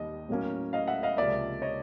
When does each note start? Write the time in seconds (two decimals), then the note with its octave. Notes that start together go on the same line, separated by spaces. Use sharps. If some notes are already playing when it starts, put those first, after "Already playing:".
Already playing: D#2 D#3 G3 D#5
0.29 A2 F#3 A#3 C#4
0.73 D#5 F5
0.88 E5 F#5
1.03 D#5 F5
1.17 C#2 C3 F3 A#3 D5 E5
1.62 C#5 D#5